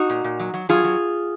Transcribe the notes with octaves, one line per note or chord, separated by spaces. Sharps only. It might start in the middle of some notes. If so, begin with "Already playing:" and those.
Already playing: D#4 F#4
A#2
A#2
F#3
F#3
F#3 F4 G#4
F#3